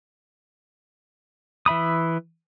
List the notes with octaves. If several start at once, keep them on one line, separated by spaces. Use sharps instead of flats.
E3 E5 B5 D#6